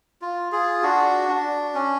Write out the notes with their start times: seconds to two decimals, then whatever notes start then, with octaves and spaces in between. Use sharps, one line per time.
0.22 F4
0.52 F4 G#4
0.83 D4 F#4
1.29 D4
1.75 C#4